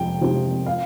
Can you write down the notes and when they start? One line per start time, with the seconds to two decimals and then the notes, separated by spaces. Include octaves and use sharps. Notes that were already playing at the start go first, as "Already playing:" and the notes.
Already playing: F2 C3 G5
0.21 C3 F3
0.66 F5